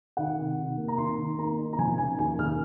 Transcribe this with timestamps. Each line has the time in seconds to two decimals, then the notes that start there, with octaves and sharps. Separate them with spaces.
0.17 D#3 F#5
0.38 C3
0.58 C3
0.77 A#3
0.88 A#5
0.98 D#3 C6
1.18 D#3
1.38 A#3 A#5
1.58 D#4
1.73 A#5
1.78 F3 G#5
1.98 C#3 G#5
2.19 D#2 G#5
2.39 D#2 F6